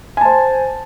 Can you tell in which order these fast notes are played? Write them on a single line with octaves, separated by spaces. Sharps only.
G#5 A5 C5